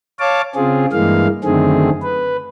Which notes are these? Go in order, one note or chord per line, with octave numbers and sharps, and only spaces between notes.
C#5 F5 A5 D6
C#3 C4 F4 G#4
G2 E3 G#3 A#3 F5
F#2 D3 D#3 A3 C4 G#4
B4